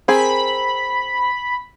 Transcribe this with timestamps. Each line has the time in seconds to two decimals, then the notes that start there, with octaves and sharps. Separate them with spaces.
0.08 C4 G#4 A#4 B5